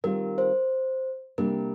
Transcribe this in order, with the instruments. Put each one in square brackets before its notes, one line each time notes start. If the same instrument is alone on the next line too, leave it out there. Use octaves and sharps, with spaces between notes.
[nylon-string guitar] D#3 G3 C4 F4 [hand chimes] A#4
[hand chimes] C5
[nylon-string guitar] C3 G3 A#3 D4 [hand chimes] A#4